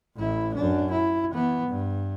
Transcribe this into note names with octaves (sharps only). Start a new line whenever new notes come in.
A1 E4
F#2 D4
E4
E3 B3
G2